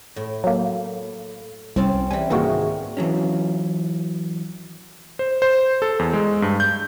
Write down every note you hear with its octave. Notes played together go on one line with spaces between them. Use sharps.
A2
F#3 A#3
C2 C4 C#4 A5
E3 G3 G#5
G#2 C3 D#3 E3 A#3 F#4
E3 F#3 C#4
C5
C5
A4
E2
G#3
G2
G6